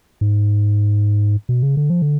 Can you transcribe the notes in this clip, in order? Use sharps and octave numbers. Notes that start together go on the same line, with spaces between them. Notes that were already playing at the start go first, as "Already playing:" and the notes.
G#2
B2
C#3
D3
F3
D3